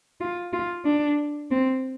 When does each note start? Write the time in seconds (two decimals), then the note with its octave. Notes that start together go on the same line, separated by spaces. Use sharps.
0.21 F4
0.53 F4
0.85 D4
1.51 C4